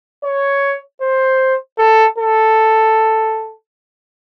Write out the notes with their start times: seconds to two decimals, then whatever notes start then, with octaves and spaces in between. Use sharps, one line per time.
0.24 C#5
1.01 C5
1.78 A4
2.18 A4